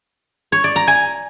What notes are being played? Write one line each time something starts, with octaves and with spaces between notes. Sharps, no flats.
C#5
D5
A#5
G#5